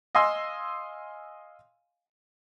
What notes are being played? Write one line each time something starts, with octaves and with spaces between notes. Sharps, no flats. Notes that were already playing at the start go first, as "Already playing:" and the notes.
D#5 F5 G#5 C6 E6